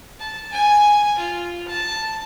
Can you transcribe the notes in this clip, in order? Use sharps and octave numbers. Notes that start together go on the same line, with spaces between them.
A5
G#5
F4
A5